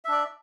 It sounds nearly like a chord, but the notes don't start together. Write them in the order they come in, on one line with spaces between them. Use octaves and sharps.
E5 D4 D5